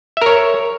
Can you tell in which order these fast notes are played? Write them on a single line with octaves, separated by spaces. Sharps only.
E5 A#4 C#5